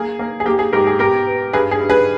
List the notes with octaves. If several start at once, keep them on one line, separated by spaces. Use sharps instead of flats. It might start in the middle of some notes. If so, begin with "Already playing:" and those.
Already playing: A#3 G#4
A#3
G#4
A#3 G4
G#4
G#2 G4 A#4
G#4
B2 G4 A#4
B3
G2 G#4 B4
G#4
G2
G#4 B4